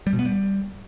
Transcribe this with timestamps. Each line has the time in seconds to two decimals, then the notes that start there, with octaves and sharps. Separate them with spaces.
0.07 G3
0.13 B2
0.19 B3
0.25 G3